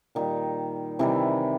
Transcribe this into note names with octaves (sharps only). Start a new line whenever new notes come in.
A#2 D#3 G3 D#4
C3 D#3 E3 G3 E4